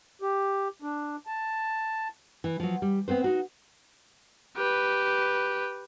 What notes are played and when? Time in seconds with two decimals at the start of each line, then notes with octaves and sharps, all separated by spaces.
0.22 G4
0.82 D4
1.27 A5
2.44 E3
2.60 F3 F#3
2.82 G3
3.08 B3 C4 B4 C5
3.24 D#4 F#4
4.57 G4 B4